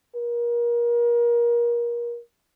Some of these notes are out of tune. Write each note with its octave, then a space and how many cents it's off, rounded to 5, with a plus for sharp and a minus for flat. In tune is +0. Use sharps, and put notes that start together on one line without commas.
A#4 +30